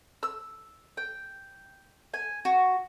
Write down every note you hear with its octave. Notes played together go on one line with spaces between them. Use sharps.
E6
G5
G#5
F#4